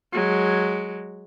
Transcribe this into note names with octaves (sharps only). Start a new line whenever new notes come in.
F#3 G#3